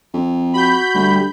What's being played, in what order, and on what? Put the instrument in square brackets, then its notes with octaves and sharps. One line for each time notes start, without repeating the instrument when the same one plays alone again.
[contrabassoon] F2
[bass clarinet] F#4 [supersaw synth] B5 G6
[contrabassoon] D2 [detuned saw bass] G3